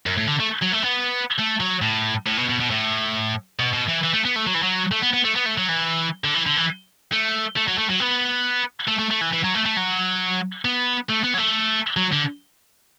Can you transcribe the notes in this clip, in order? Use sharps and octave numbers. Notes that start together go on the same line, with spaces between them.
F#2
A2
D3
A3
F#3
A3
B3
A3
F#3
A2
A2
B2
B2
B2
A2
B2
B2
E3
E3
A3
B3
A3
F#3
E3
F#3
A3
B3
B3
A3
B3
A3
F#3
E3
D3
E3
D3
E3
A3
A3
F#3
A3
F#3
B3
A3
A3
A3
E3
E3
F#3
A3
A3
F#3
B3
A3
B3
F#3
A3
F#3
D3